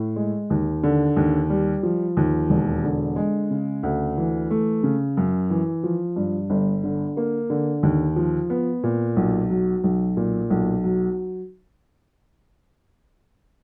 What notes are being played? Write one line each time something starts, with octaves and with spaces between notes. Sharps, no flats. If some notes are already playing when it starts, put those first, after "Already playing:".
Already playing: A2
G#3
D#2
D3
D#2
G3
F3
D#2
E1
D3
G#3
C#3
D2
E3
A3
C#3
F#2
E3
F3
G2
G1
D3
A#3
D3
D#2
F3
B3
A#2
B1
F#3
B1
A#2
B1
F#3